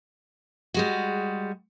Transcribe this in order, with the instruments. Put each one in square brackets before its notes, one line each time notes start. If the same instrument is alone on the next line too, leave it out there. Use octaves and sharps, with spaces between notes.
[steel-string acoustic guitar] G3 G#3 F#4